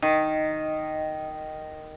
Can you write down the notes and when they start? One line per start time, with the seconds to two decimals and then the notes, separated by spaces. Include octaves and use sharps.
0.02 D#3 D#5